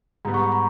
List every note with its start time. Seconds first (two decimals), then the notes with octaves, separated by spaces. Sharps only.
0.25 G#2 G3 B3 A#5
0.34 C#6
0.43 B5
0.52 A#5